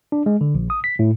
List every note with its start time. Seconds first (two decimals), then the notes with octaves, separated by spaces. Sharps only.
0.12 D4
0.26 G#3
0.41 D3
0.55 A#1
0.70 D#6
0.84 B6
0.99 A2